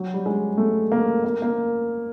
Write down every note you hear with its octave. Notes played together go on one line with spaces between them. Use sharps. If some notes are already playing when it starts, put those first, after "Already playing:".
Already playing: F#3
G3
G#3
A3
A#3
A#3
A#3